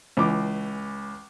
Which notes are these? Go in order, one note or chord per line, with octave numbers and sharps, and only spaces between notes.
C#2 E3 D6